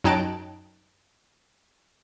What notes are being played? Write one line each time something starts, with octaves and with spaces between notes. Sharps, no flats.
F#2 D#4 G5 A5 F#6 D7